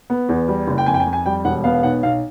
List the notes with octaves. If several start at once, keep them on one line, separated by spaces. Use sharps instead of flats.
B3
E2
G3
F#1
G5
F2 G#5
G5
G#5
F2
G#5
G3 G5
E1 F#5
B3 F5
F5
B1 F#5
B1 F5